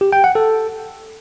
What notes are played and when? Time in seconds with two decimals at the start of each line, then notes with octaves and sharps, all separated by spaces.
0.01 G4
0.12 G5
0.24 F#5
0.35 A4